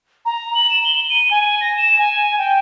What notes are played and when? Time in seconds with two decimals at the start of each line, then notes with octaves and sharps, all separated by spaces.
0.25 A#5
0.55 F#7
0.70 E7
0.84 G7
1.10 D#7
1.31 G#5
1.61 A#6
1.77 E7
1.99 G#5
2.38 G5